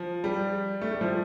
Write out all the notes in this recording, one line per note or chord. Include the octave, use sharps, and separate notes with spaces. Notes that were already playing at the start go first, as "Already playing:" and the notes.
Already playing: F3
G3
A3
G3
F3